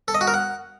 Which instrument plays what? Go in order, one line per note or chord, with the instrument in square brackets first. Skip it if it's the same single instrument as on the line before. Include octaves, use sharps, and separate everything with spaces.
[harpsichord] A4
D#5
F#4
A#4
F#5